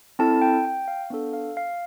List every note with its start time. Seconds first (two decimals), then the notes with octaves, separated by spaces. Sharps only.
0.19 C4 E4 A4 A5
0.42 G5
0.65 G5
0.88 F5
1.10 B3 D4 A4 F5
1.34 F5
1.57 F5